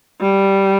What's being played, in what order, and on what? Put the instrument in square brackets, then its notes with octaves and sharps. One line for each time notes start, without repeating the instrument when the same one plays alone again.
[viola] G3